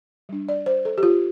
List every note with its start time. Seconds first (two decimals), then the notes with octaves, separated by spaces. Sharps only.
0.29 G3 D4
0.49 D5
0.66 C5
0.85 A4
0.98 G4
1.03 F4